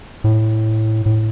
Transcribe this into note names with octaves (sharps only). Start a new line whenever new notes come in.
A2
A2